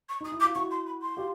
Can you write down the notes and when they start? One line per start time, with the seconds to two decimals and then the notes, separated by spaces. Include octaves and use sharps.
0.09 C#6
0.21 D#4 D#6
0.32 E4
0.40 D6
0.44 F4
0.55 E4 F#4 C#6
0.71 C6
0.86 B5
1.02 C6
1.17 F4 G4